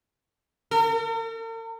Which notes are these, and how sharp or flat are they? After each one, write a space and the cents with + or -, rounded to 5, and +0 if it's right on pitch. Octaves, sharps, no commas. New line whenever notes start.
A#4 -45